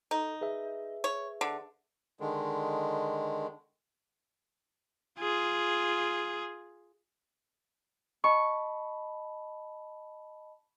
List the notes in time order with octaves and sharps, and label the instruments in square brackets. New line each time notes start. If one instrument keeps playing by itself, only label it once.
[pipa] D#4 [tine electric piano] A4
[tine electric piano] G#4 B4 E5
[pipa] C#5
D3
[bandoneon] D3 D#3 G#3
[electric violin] F4 G#4
[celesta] D#5 A5 B5 [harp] C#6